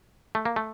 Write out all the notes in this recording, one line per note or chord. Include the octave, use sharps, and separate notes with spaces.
A3
A#3
A3